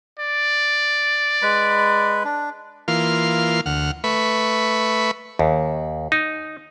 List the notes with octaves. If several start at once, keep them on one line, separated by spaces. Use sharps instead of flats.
D5
G#3 B4 B5
D4
E3 A#3 F4 C6 F6
D2 F#5 F6
A3 B4 E5 B5 C#6
D#2
D#4